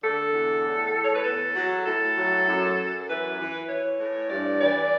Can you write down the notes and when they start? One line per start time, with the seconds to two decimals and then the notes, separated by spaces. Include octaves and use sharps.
0.02 D3 A4
0.32 E2
0.63 A2
0.94 A2
1.04 C#5
1.14 B4
1.23 E2 A4
1.55 F#3
1.85 A2 A4
2.16 F#3
2.46 F#2
2.77 F#2
3.08 E3 B4
3.38 E3
3.69 E3 C#5
4.00 A2
4.30 G2 D5
4.60 E3 D5